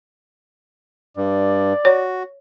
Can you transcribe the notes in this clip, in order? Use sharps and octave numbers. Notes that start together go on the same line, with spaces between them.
G2 D5
F#4 C#5